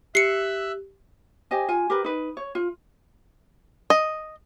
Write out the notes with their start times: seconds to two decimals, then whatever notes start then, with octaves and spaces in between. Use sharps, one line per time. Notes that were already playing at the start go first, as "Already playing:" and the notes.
0.15 G4 E5 E6 F#6 C7 C#7
1.51 G4 C5 D#5 G#5
1.68 F4 G#5
1.90 G4 A#4 B4
2.04 D#4 B4
2.37 C#5
2.55 F4
3.90 D#5